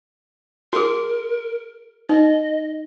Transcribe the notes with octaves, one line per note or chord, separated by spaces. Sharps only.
F#4 G#4 A#4
D#4 D#5